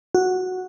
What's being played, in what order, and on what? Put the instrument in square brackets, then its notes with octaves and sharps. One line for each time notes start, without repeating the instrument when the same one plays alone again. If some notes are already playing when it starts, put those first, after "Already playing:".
[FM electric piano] F#4